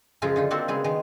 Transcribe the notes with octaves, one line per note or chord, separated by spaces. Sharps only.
F#2 C#3 F3 G#3 F4 A#5
D3 D#4 F4
A#3 C4 D4 F#4 A4
C#3 G#3 B3
D#3 G#3